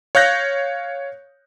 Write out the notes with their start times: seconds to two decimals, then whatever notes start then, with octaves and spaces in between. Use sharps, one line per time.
0.15 C#5 F5 F#6 G6 A#6